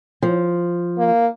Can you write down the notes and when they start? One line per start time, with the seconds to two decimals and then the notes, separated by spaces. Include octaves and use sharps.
0.22 F3
0.98 A#3